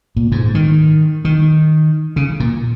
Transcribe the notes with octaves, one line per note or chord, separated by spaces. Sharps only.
A#2
G#2
D#3
D#3
C#3
A#2